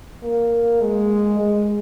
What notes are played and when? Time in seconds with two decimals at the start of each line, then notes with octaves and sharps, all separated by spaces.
0.23 A#3
0.81 G#3
1.39 G#3